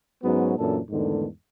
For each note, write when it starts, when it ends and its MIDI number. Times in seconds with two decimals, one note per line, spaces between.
0.23 0.54 44
0.23 0.54 54
0.23 0.54 59
0.23 0.54 61
0.23 0.54 66
0.57 0.78 42
0.57 0.78 46
0.57 0.78 52
0.57 0.78 62
0.57 0.78 69
0.91 1.26 40
0.91 1.26 44
0.91 1.26 50
0.91 1.26 51
0.91 1.26 57